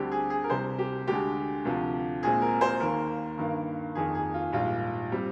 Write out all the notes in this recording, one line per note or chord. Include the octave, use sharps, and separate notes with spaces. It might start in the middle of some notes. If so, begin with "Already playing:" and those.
Already playing: D2 D3 G3 C4 G4
G#4
G#4
A#4
C2 C3 G3 C5
G4
D2 D3 G#3 G4
D2 C3 F3
A#1 A#2 G#3 C4 G#4
A#4
C5
D#2 D#3 A#3 A#4
G2 D#3 A#3
F2 D#3 A#3 G#4
G#4
F4
A#1 G#2 G3 F4
G3 C4